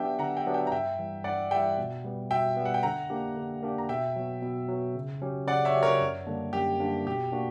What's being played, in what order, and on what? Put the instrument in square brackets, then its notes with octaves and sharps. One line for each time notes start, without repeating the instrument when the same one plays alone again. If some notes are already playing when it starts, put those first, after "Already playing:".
Already playing: [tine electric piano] F#3 B3 D4 G4 [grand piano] E5 G5
[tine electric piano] D3 [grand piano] F#5 A#5
[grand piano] E5 G5
[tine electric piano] F#3 B3 D4 G4
[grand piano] E5 G5
A#5
[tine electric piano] G2 [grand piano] E5 G5
[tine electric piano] E3 G3
[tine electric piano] G2 [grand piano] D5 F#5
[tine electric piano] G3 [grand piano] E5 G5
[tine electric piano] E3
B2
G3 B3
[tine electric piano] B2 [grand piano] E5 G5
[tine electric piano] G3 B3
[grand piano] F#5
G5
[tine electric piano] D3 [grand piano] F#5 A#5
[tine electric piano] A#3 D4 G4
D3
A#3 D4 G4
[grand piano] A#5
[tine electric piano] B2 [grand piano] E5 G5
[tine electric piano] F#3 B3
B2
F#3 B3
C#3
F#3 C#4 G4
[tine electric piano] C#3 [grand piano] D5 F#5
[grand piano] C#5 E5
[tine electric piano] F#3 C#4 G4
[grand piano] A#4 C#5
[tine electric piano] F#2
D3 G3 A#3 D4
[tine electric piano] F#2 [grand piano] G4
[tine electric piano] D3 G3 A#3 D4
[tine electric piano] B2 [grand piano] G4
[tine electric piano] A#3 D4 F#4